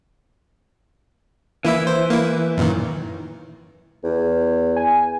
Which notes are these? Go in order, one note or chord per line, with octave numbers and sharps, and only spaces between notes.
E3 A#3 E4 E5
C5
A#3 E4
F#2 A#2 D#3
E2
G#5